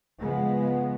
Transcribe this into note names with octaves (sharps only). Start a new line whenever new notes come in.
C#3 F3 G#3 B3